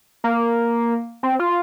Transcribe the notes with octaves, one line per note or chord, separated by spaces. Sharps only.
A#3
C4
F4